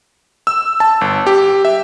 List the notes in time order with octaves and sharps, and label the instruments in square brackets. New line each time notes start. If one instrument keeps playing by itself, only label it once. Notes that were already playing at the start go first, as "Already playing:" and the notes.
[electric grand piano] E6
A5
G1
G4
E5